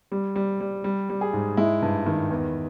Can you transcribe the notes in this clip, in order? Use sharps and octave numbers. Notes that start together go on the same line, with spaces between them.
G3
G3
G3
G3
G3
G#4
G#2
G#3 E4
G2
D#3
E2